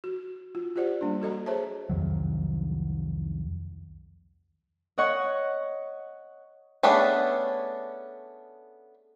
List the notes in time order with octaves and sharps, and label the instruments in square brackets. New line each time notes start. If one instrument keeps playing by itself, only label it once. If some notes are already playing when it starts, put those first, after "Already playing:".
[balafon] F#4
F4
F4 G4 C5 D5 F#5
G3 A#3 D4
F#4 A4 D#5 A#5
G#4 C5 C#5 E5 A5
[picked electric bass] C2 F2 D#3 F#3
[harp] C#5 D#5 F#5 C#6
[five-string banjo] A3 B3 C#4 D4 G#4